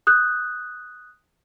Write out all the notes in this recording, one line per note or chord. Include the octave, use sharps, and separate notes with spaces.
D#6 F#6 G6